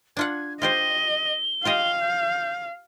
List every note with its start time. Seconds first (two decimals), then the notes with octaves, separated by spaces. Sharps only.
0.17 D4 F4 F#5 G#6
0.62 F4 G4 C5 D#5 G7
1.65 F4 G4 D#5 F5
2.01 G6